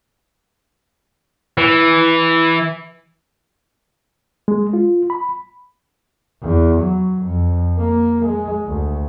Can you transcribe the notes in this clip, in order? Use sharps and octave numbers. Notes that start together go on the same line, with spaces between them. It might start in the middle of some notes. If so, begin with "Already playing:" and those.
E3
G#3
F4
B5
E2
F#3
F2
A#3
G#3
D2